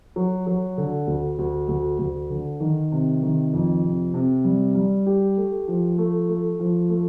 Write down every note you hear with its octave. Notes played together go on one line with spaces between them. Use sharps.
F#3
F#3
D3
D2
D2
D2
D2
D3
D#3
C3
D#3
F2
C3
C3
G3
G3
G4
A3
F3
A3
A3
F3
A3